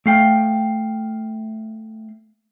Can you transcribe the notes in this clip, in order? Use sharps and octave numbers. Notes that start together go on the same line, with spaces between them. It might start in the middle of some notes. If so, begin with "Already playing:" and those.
A3 F5 G5